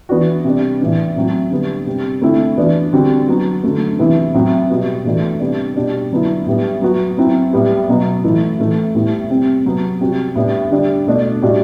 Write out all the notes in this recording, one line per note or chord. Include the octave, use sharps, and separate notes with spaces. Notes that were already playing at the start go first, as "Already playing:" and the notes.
E3 B3 D4 F#4
C3 G3 D4
A2 E3 B3 D4
A2 F#3 C4 F#4
D3 G3 B3
C3 G3 C4
D3 A3 C4 E4
E3 B3 D4 F#4
D3 G3 C4 F#4
F#3 B3 F#4
D3 F#3 A3
C3 E3 B3 E4
A2 F#3 C4 F#4
B2 G3 B3 F#4
A2 E3 A3 D4 F#4
C3 G3 B3 D4
B2 G3 D4
D3 F#3 B3 E4
A2 G3 B3
F#3 B3 F#4
F#3 C4 E4
A2 G3 B3
B2 F#3 B3
A2 E3 A3 E4
A2 E3 A3
A2 G3 B3 E4
C3 G3 C4
C3 F#3 B3
C3 G3 C4 F#4
A2 G3 B3 D4
D3 G3 D4
B2 A3 D4
A2 G3 D4 F#4